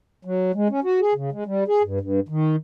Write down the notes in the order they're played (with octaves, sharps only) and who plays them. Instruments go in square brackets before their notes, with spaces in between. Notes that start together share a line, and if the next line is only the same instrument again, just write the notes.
[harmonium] F#3
G#3
C#4
F#4
G#4
C#3
G#3
G3
G#4
G2
G2
D#3